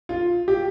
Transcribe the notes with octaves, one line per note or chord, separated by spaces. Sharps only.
F4
G4